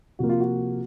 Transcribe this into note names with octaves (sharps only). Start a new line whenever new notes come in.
C3 F3 A#3 F#4
F4
F#4